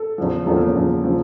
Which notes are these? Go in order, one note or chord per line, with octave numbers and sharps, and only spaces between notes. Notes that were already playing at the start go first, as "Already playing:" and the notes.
Already playing: A4
E2 C#3 F3
E2 C#3 F3 A4
A#3
C#4
E2 C#3 F3
C#3 F3